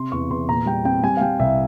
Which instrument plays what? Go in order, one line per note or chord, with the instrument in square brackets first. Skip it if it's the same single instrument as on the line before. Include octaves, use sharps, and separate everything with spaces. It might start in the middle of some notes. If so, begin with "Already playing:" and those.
Already playing: [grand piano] C3 C6
E2 C#6
E2 C6
A#2 A#5
G3 G5
C4 G5
G3 G#5
F5
G3 G5
C2 E5